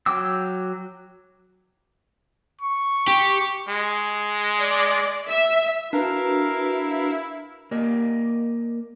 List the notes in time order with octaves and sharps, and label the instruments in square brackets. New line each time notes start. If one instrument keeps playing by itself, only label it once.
[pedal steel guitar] F#3 G5 D6 E6
[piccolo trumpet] C#6
[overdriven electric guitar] G4
[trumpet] G#3
[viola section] D5
E5
[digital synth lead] D4 [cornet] E4 [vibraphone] F#4 B4 [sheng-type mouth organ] A#4 F5
[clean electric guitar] A#3 A#4 D5 D#5